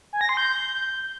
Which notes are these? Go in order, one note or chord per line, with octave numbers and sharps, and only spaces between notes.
G#5
A#6
C6
G6